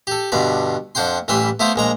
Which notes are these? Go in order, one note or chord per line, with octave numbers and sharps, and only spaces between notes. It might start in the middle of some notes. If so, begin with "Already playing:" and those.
G4 A4
G2 B2 D3 D5
F2 D4 F#5 G5 C6
A1 E3 G3 B4 E5 C6
A3 B3 E4 F4 C5
A#1 G#3 A#5